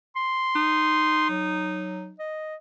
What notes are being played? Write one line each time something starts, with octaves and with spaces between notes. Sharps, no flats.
C6
D#4
F#3
D#5